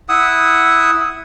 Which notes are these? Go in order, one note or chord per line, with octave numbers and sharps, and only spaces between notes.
E4 F#5 D#6 E6